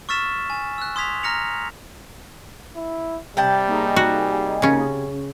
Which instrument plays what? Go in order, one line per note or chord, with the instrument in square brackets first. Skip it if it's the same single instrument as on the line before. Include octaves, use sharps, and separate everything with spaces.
[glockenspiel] C#6 E6 F6 A6 B6 E7
G#5
E6 F#6
C6 D#6 G#6 B6 F7
A#5 F6 A#6 C#7 F7
[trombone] E4
[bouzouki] C3 G5 A5 [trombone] G3
[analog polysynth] A#3 D#4 G#4
[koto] F#4
C#3 C#4